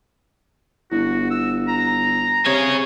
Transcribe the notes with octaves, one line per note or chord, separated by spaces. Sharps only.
G1 E4 F#4
E6
A#5
C3 G#4 C#5 G#6